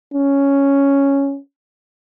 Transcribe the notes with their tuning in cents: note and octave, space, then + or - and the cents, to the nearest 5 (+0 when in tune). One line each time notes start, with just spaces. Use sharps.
C#4 +0